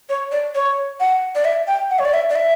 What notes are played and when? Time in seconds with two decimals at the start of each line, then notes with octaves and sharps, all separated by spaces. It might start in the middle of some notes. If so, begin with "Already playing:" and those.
0.09 C#5
0.32 D5
0.55 C#5
1.00 F#5
1.35 D5
1.45 E5
1.68 G5
1.90 F#5
1.99 C#5
2.05 D5
2.14 E5
2.30 D5
2.36 E5